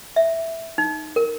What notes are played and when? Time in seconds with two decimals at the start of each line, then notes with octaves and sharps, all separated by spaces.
0.16 E5
0.78 D#4
1.16 A#4